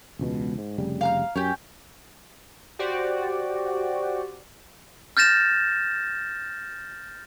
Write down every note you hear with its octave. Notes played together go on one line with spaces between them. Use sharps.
E1 C#2 B2
G#2
F1 C#3 G3
F5 A#5 F6
F#2 C#4 G4
F#4 G4 C5 D5
F6 G6 A6 A#6 E7